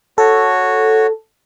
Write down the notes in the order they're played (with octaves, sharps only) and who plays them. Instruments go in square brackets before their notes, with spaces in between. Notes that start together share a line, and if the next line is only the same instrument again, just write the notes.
[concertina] F#4 C#5 [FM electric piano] A4